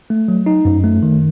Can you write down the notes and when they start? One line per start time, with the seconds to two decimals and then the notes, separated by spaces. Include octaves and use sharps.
0.10 A3
0.28 F#3
0.46 D#4
0.65 F#2
0.84 A3
1.03 D#3